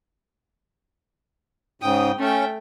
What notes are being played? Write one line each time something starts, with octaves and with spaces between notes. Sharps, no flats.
G#2 C#3 G5 D#6
A3 C#4 G5